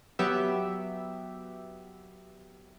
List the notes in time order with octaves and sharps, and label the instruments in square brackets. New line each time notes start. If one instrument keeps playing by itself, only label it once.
[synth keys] F#3 B3 G4 E5